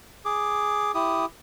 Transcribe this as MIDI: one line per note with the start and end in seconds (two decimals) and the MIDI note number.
0.25 0.92 68
0.25 0.92 86
0.94 1.25 64
0.94 1.25 67
0.94 1.25 87